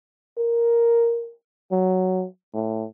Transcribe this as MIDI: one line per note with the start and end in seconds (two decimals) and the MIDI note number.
0.38 1.32 70
1.71 2.25 54
2.54 2.85 45